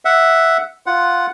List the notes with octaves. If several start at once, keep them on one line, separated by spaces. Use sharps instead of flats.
E5 F#5
F4 F#5